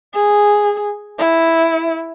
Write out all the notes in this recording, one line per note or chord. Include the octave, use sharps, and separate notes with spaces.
G#4
E4